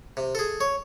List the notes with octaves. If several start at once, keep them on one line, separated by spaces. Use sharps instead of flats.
C3
G#4 A4
C#5